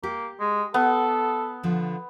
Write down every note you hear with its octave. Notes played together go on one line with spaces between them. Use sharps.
A#3 G4
G#3
B3 A4
D3 F3